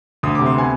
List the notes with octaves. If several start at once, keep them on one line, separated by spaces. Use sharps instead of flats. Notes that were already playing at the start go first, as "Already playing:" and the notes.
D2 D#6
C3 D6
C6
B3 G#5